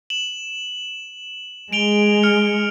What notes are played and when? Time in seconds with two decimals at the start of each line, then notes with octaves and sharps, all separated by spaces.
0.10 E7 F#7
1.73 G#3 G#4 D7 F7 G7
2.23 F6 C#7